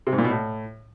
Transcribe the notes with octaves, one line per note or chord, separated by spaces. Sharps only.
C3
G#2
A#2
B2
A2